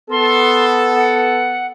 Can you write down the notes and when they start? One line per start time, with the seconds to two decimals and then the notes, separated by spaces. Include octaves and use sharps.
0.11 B3 A4 C6
0.96 F#5